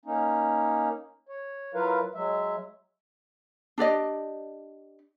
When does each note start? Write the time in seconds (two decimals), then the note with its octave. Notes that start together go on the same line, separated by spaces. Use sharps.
0.05 A#3 C#4 D#4
1.29 C#5
1.74 F#3 E4 F4 A#4 B4 F5
2.15 F#3 G#3 E5
3.78 D4 G4 D5 D#5